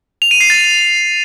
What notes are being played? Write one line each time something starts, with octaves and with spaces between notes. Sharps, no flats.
F7
D#7
C7
A6